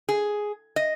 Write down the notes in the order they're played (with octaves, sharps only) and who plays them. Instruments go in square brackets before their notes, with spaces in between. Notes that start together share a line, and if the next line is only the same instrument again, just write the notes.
[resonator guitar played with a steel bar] G#4
D#5